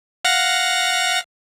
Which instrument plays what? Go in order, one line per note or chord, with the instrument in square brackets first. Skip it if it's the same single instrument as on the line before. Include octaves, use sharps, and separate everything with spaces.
[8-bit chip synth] F5 F#5 A#6